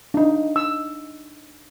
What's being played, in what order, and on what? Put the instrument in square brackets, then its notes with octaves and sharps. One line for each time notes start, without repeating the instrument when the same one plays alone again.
[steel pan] D4 D#4
E6